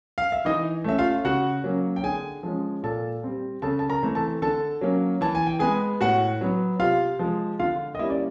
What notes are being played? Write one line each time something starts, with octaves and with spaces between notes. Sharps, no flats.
F5
E5
E3 D#4 D#5
A3 C#4 E5
F4 F5
C#3 F#4 F#5
F#3 A#3 C#4
G5
D3 G#4 G#5
F3 G#3 C#4
A#2 A4 A5
G3 C4
C#3 A4 A5
A5
A#4 A#5
E3 A3 C4
A4 A5
D3 A4 A5
F#3 A#3 C#4
E3 A5
G#5
G5
G#3 B3 G#4 G#5
A2 F#4 F#5
F#3 B3
C3 F4 F5
F3 G#3
D3 F4 F5
D#5
G3 A#3 C#4 E4 E5
D5